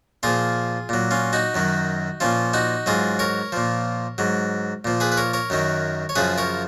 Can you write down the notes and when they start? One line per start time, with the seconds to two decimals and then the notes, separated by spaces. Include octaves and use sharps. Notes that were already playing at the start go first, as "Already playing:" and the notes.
0.23 A#2 F3 F4 G#4
0.89 A#2 F#3
1.11 C#4 F4
1.33 D#4 F#4
1.55 F#2 D#3 F#3
2.20 A#2 F3 C#4 F4
2.53 D#4 F#4
2.86 G#2 F#3 F4 G#4
3.19 A#4 C#5
3.52 A#2 F3
4.18 G#2 F#3
4.85 A#2 F3
5.00 G#4 B4
5.12 B4
5.17 A#4 C#5
5.33 A#4 C#5
5.50 F#2 D#3 F#3
6.09 C#5
6.16 F#2 C#3 F3 G#4 B4
6.38 A#4 C#5